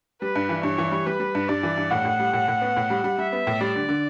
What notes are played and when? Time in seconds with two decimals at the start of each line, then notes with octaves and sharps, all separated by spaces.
0.22 G3 B4
0.36 G2
0.49 E3
0.63 G2 C#5
0.78 E3
0.92 G3
1.07 G3 B4
1.20 G3
1.35 G2
1.49 G2 D5
1.63 E3
1.78 G2
1.91 A2 F#5
2.05 A2
2.19 G3
2.33 A2
2.48 A2
2.61 B3
2.76 A2
2.90 G3
3.04 G3
3.18 G3 E5
3.32 B3
3.47 A2
3.60 G3 D5
3.76 D3
3.89 D3